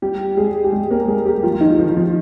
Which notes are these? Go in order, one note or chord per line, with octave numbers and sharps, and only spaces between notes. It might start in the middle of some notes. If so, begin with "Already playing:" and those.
G3 G4
G#3 G#4
G4
G#3 G#4
A#3 A#4
G#3 G#4
G3 G4
F3 F4
F4
D#3 D#4
F3 F4
F3 F4